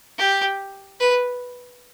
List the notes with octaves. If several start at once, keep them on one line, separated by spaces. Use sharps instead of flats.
G4
B4